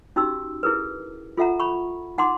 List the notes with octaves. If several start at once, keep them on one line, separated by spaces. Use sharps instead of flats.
C#4 D#4 F#4 G4 E6
E4 G#4 A#4 B4
F4 A4 E5 F#5 A#5
B5 C#6
D#4 F#5 A#5 C6 D6